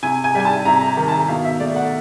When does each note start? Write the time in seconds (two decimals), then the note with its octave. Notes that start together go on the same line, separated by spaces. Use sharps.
0.03 C3 G#5
0.24 G#5
0.35 G3
0.40 G#5
0.45 A5
0.65 C3 A#5
0.81 A#5
0.97 D#3
1.08 A5
1.13 A#5
1.29 B2 F5
1.45 E5
1.60 A3 D5
1.76 F#5